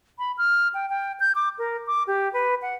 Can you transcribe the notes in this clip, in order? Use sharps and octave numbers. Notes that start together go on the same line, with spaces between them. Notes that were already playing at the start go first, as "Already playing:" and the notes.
B5
F6
G5
G5
G6
D6
A#4
D6
G4
B4
F#5